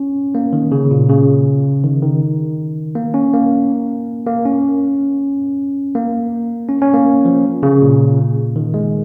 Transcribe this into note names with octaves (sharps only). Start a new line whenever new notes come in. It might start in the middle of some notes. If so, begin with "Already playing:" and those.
Already playing: C#4
A#3
D#3
C#3
A#2
C#3
D#3
D#3
A#3
C#4
A#3
A#3
C#4
A#3
C#4
C#4
A#3
F3
C#3
A#2
D#3
G#3